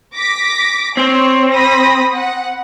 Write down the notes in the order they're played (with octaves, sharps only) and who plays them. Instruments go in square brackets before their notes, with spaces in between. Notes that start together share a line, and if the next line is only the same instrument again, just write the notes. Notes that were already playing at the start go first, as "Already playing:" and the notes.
[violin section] D6 A#6 B6
[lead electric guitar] C4 [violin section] C#5
[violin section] B5 D#6 A#6
F#5